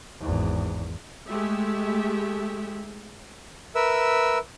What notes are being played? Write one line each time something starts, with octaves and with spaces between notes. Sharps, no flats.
G#1 E2
G#3 A3 G4 E5
A#4 B4 E5 E6